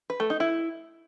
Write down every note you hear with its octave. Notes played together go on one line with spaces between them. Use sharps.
B4
A3
D#4
E4